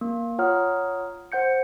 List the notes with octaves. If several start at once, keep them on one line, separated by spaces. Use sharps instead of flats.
A#3
F4 C#5 F#5 A#5 D#6 F6
C5 F#5 G6 C#7